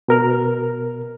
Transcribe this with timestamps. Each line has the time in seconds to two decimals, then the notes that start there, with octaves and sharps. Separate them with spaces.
0.08 B2 A#4 F6